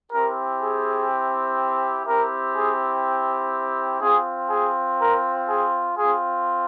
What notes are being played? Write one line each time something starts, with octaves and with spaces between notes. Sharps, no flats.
C4 E4 G4 A#4
G#4
C4 E4 G4 A#4
G#4
C4 F4 G#4
G#4
A#4
G#4
C4 F4 G#4